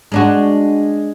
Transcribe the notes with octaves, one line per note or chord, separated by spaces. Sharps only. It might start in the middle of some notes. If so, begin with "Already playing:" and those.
G#3 D4 F#4